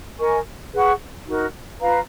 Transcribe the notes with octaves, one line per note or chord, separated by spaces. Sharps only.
A#4 D#5 G#5 C#6
G#4 B4 F#5 C#6
D#4 F#4 A#4
F4 B4 F5 A#5